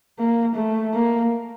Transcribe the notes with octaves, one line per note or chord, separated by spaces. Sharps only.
A#3
A3
A#3